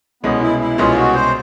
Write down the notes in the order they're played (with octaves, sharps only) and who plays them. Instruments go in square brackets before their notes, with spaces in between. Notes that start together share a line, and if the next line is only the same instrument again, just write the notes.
[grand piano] C2 B2 G#3 C#4 [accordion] B3
[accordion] E4
E4
[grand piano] C2 B2 G#3 C#4 [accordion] F4
[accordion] F#4
C5